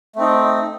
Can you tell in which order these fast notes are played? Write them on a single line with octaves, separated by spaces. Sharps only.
A3 C4 D#4